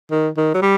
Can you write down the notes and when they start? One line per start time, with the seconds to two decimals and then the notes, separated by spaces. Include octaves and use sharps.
0.11 D#3
0.37 D#3
0.54 F#3
0.62 G3